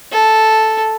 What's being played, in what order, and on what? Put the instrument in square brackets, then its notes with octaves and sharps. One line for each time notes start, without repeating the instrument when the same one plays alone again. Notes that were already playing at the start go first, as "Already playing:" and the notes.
[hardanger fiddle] A4